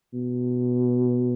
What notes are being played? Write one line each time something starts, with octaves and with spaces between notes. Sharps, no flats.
B2